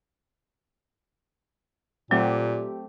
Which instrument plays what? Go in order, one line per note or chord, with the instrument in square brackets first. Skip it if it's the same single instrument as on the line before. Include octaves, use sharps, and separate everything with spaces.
[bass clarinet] A#2 [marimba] F#3 [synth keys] A3 C4 G4